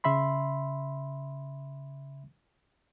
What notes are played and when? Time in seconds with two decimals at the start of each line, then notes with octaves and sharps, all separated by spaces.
0.04 C#3 E5 B5 C6